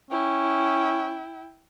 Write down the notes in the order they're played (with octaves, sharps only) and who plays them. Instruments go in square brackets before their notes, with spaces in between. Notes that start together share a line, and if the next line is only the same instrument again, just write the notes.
[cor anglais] C#4 [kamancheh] E4 G5